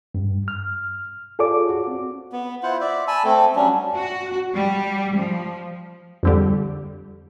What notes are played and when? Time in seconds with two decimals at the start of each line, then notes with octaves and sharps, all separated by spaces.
0.15 G2
0.48 F6
1.39 F4 G#4 A4 C#5 D5 D6
1.69 F#4
1.87 C4
2.32 B3
2.63 E4 F4 C5 F#5
2.81 D5 E5
3.08 G#5 A5 B5 E6
3.24 A3 C4 A4
3.56 F#3 G3 C#4 D4
3.95 F#4
4.54 G3
5.14 F3
6.23 F2 D3 G3